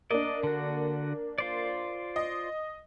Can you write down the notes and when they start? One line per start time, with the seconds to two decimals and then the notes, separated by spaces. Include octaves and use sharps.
0.11 A#3 D4 D5 D#5
0.43 D3 F#4
1.38 F4 C5 D5
2.16 D#5